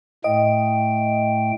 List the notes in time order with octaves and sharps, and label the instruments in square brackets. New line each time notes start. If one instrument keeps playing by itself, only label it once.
[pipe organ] A2 A3 G5 [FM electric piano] D#5